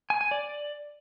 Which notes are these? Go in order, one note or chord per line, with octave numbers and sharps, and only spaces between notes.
G#5
G#5
D5